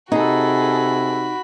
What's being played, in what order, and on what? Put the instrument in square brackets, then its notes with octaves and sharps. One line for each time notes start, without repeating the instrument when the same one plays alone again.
[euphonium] C3 [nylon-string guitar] D#4 [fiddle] F#4 B5 [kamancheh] G#4 A4